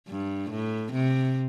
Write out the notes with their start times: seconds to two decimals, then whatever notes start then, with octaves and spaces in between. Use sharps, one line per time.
0.08 G2
0.51 A2
0.92 C3